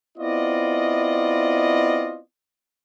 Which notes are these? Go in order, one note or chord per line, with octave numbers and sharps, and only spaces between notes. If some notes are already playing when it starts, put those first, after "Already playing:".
B3 C4 E4 F4 D5 D#5